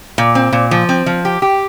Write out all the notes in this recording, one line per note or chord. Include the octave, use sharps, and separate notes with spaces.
A#2
C4
A#2
F3
C4
F3
G4
G4